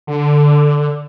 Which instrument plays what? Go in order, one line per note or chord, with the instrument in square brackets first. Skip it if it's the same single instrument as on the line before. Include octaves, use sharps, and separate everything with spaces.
[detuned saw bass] D3